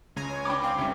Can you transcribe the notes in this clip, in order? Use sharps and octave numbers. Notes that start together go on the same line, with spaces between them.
C#2 C#3 G#5 A#5
C#5
C#4 D4 G5 B5 D6
C4 F5
F#1 C2 C3 C#4 D#4 E5